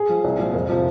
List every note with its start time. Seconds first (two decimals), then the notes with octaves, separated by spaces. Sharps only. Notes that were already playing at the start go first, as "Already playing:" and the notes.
Already playing: G#4
0.09 F3
0.24 C2
0.39 A#2 F3
0.53 F2 A#4
0.69 C3 F3